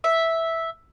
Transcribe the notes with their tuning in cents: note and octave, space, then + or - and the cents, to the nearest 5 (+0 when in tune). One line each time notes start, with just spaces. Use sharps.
E5 -5